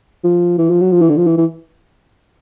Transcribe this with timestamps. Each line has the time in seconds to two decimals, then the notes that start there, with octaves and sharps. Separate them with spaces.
0.24 F3
0.58 E3
0.70 F3
0.81 F#3
0.92 F3
1.01 E3
1.09 D3
1.17 F3
1.27 E3
1.38 E3